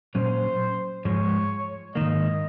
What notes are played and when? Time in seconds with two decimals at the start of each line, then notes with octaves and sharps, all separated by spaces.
0.15 A#2 F#3 C#4 C5
1.05 G#2 F3 G#3 C#5
1.95 G#2 D#3 A#3 D#5